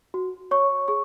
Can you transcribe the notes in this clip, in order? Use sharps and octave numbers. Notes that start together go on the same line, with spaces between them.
F#4
C#5 C#6
G#4 C#6